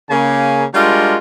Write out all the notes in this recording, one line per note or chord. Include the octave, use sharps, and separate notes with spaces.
C#3 A#3 G#5
G3 G#3 D4 F4 F#4 A#4